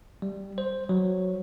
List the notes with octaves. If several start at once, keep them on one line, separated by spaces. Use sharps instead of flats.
G3
C5
F#3